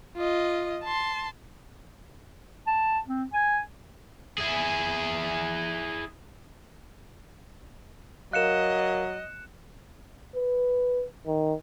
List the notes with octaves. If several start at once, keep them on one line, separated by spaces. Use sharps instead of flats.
F4 D#5
A5 C6
A5
C4
G#5
E4 G#4
F#3 A#4 D#5 F5 F#6 C#7 E7
B4
D#3